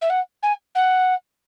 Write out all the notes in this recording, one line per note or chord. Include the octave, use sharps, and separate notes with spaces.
E5
F#5
G#5
F#5